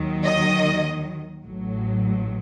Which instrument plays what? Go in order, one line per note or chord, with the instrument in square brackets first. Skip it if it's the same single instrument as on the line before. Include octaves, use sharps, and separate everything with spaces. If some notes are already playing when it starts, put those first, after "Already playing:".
Already playing: [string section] D#2 D#3 F#3
D#5
A1 A2 F#3